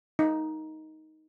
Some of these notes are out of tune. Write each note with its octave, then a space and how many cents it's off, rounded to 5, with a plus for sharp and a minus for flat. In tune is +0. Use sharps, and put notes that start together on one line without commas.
D#4 +10